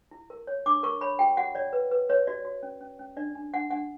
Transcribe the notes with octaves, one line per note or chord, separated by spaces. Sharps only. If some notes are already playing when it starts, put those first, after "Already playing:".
E4
A#4
C#5
D4 D6
A#4 C#6
C#5 B5
F#4 G5
F#4 F#5
C#5 D5
B4
B4
B4 C#5
F#4 D5
F#4
C#4
C#4
C#4
D4 D5
D4
D4 F#5
D4 F#5